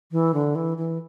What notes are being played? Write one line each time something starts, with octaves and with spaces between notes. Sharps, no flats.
E3
D3
E3
E3